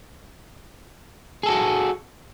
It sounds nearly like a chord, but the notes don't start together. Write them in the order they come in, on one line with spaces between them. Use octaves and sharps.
G#4 A4 F#4